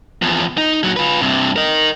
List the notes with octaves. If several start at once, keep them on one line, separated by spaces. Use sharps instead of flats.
E2 F3
D#4
A#2 F#3
F4 B4
G2 C3
A#4 D#5